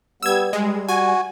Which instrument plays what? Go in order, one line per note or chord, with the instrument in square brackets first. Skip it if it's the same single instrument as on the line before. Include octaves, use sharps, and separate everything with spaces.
[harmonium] G3 B3 [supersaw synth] E6 G#6
[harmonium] G3 [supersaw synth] G#3
[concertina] F#4 [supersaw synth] G#5